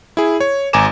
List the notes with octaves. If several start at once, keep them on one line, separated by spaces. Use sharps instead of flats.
E4 G#4
C#5
G#1 G#5 A#5 D6 E7